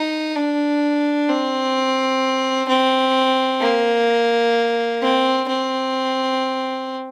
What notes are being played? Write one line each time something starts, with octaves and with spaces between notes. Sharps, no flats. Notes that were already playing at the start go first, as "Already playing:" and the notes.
Already playing: D#4
D4
C4
C4
A#3
C4
C4